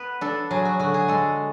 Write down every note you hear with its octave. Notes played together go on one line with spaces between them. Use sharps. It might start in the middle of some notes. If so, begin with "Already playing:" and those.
Already playing: B3 B4
D4 A4
F#3 G#4
F#4
D3 F#4
G#4
G#3 A4